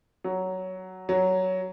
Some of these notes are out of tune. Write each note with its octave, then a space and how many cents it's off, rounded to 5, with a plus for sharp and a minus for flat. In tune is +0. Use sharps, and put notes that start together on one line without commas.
F#3 +10
F#3 +10